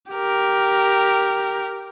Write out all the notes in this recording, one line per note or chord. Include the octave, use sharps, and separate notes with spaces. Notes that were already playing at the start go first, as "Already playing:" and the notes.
G4 A#4